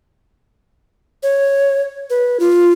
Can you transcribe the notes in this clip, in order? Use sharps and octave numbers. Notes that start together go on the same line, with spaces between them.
C#5
B4
F4